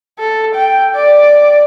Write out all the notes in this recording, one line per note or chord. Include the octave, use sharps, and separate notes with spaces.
A4
G5
D5